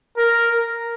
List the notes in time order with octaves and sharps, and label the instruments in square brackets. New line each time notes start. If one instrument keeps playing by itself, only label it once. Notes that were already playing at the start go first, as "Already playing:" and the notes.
[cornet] A#4